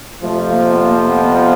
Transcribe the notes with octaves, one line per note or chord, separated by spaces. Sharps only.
F2 C3 F3 A3
A#3
B3
A#3
B3